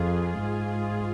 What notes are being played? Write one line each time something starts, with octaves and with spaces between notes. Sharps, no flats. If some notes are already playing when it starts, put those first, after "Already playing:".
Already playing: F2 F4 G#4
G#2